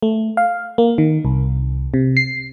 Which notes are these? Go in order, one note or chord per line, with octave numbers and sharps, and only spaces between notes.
A3
F5
A#3
D#3
C2
C3
C7